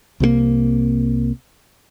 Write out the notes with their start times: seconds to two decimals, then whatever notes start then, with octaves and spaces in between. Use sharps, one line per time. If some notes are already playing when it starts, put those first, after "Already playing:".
0.20 C2 C3 F3 A#3